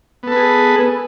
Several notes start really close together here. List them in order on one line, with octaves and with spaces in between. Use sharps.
B3 A4 B4 G#4